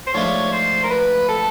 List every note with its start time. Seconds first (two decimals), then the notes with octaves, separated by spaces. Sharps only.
0.07 C5
0.14 G#2 F3 A3 D4 F4 C#5
0.52 C5
0.83 A#4
0.90 B4
1.29 A4